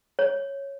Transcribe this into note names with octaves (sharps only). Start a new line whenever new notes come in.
C#5